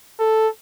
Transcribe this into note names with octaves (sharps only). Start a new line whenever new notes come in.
A4